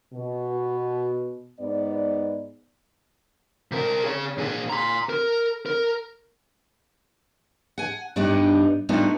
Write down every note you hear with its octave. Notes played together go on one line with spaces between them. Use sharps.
B2
G#2 B3 D5
C3 A#4
G#4 C#5
A#2 G#4
A#5 C6
A#4
A#4
F#5 G#5
G2 G3 B3 D4 D#4
G3 A3 B3 D4 D#4 F4